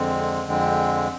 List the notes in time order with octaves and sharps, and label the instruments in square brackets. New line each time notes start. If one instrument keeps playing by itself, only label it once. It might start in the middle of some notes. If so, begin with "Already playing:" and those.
Already playing: [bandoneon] F2 D3 G#3 C4
F2 D3 G#3 C4